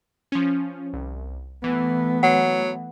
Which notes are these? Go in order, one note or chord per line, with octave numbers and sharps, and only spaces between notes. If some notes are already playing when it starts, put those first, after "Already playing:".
F3 C#4
C2
E3 A3 B3
F#3 F#5